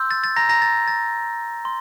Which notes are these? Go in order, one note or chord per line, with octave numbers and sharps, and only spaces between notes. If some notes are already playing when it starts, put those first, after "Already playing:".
Already playing: C6 E6 G6
A6
A6
A#5 A#6
A#5 A#6
A6
A6
C6